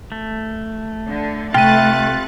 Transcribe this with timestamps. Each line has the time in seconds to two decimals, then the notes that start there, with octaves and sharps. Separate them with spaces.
0.12 A3
1.08 D3
1.54 C3 A3 F4 B4 G5 F#6 A6 D#7